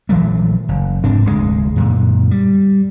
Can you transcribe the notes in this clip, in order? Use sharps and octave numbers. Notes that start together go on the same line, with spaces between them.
A#1 E3 F#3 A3
F#1
F1 G#2 C4 D4
F1 D2 A2 G#3
F#2 A#2 D3
G3